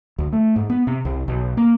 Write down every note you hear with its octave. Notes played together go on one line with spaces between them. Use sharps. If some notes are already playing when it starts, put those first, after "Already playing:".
D2
A3
G#2
B3
C3
C2
B1
A#3